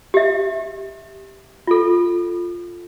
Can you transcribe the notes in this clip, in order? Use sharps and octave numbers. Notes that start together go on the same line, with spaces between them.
G4 E5
F4 A4